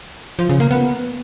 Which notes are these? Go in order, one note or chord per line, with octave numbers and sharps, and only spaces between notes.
F3
C#3
A#3
B3